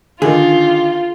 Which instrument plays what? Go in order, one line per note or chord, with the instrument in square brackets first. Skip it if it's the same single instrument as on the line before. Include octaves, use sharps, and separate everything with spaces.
[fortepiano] D3 D#3 [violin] F4 [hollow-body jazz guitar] G#4